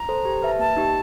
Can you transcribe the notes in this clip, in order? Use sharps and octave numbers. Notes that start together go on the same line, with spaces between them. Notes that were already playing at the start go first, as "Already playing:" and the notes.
Already playing: A#5
A4 C5
G4
B4 E5 A5
A#3 A5
D#4 G4